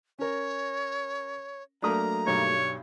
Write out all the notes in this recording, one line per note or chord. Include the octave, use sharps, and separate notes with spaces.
C#4 A#4 C#5
F#3 A3 A#3 D4 A#5 D#6
B1 G2 G3 C#5